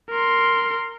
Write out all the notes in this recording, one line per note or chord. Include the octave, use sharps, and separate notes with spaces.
A#4 C6